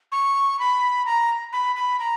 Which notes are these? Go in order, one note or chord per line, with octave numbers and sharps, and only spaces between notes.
C#6
B5
A#5
B5
B5
A#5